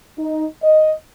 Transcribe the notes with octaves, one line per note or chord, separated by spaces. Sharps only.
D#4
D#5